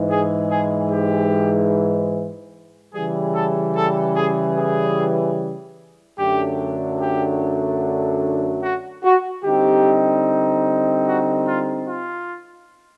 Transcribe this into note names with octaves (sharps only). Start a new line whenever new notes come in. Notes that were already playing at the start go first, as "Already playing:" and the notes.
Already playing: G#2 E3 G#3
G#4
G#4
G4
C#3 E3 G3 G#4
A4
A4
G#4
G#4
F#2 D3 F#3 A3 D4 G4
G4
F#4
F#4
D3 G3 C4 D#4 G4
F#4
F4
F4